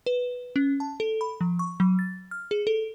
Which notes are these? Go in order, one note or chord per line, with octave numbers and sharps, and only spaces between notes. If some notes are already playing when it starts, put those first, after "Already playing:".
B4
C#4
A5
A4
B5
F3
C#6
F#3
A6
F6
G#4
A4